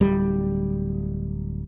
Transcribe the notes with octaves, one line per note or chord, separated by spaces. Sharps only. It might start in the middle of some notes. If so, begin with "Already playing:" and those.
D1 G3